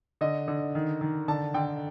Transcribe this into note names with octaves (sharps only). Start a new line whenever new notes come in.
D3 D#5
D3
D#3
D#3
D3 A5
D3 G5